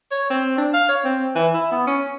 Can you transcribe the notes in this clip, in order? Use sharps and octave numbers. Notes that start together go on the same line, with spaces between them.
C#5
C4
D4
F5
C#5
C4
E3
E4
B3
C#4